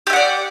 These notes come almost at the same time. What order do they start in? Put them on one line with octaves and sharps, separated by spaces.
G4 E5 F#5 D5